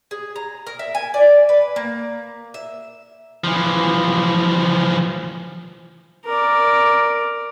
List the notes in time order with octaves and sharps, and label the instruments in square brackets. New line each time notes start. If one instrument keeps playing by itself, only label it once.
[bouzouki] G#4
A#5
A#4
E5
G#5
D5
B4
A#3
E5
[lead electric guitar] E3 F3
[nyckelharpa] A#4 D5